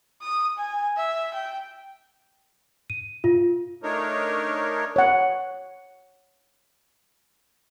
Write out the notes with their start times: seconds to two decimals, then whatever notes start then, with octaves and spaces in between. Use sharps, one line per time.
0.22 D#6
0.57 G#5
0.97 E5
1.34 G5
2.90 D#7
3.24 F4
3.83 A3 D4 D#4 A#4 C#5
4.96 C#5 F#5